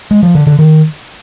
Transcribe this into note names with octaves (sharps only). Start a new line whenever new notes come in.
G#3
F3
D3
D3
D#3